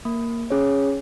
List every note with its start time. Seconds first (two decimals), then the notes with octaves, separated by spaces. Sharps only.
0.05 A#3
0.50 C#4 G#4 C#5